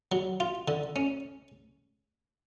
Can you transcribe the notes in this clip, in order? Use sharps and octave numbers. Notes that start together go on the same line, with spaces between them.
F#3
F4
D3
C#4